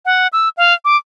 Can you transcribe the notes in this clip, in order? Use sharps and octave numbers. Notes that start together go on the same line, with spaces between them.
F#5
E6
F5
D6